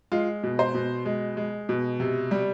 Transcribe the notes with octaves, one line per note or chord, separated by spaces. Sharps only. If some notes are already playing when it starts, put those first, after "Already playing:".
G#3 F4
B2
C5
B2
G#3
G#3
B2
C3
G3